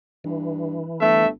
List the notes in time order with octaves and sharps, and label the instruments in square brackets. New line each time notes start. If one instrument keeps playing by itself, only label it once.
[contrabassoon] G2 [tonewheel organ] E3
[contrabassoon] G1 [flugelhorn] A3 [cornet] E5